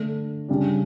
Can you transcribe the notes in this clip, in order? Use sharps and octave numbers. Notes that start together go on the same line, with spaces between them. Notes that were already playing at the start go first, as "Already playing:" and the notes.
Already playing: D3 A3 D4
C#3 G3 D4